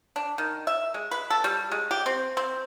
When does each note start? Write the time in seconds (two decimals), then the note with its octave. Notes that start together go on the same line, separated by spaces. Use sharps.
0.16 D4
0.38 D#3
0.67 E5
0.94 G#3
1.11 B4
1.30 A4
1.44 G3
1.72 G#3
1.91 G4
2.06 C4
2.37 C4